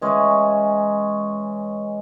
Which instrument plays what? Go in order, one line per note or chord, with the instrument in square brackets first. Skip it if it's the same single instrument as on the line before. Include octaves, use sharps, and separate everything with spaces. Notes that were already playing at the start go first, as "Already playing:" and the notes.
[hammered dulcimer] E3 G#3 C#4